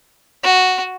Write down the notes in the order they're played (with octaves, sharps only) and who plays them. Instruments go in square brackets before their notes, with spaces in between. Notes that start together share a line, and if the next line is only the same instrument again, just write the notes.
[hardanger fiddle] F#4